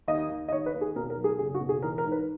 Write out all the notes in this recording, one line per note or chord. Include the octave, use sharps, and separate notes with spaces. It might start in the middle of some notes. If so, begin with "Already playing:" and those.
D#2 D#5
D#2
D#5
D#2 C#5
B4
D#2
G#4
B2 A#4
A#4
F#3
G#4
F#1 G#4
F#4
B2
G#4
E3 A#4
A#4
G#2
B4